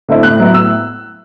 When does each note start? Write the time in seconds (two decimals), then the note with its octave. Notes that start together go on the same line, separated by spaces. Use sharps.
0.09 D3 A3 C4 E4
0.23 A2 F#6
0.40 F#3 B3 E4
0.54 A2 E6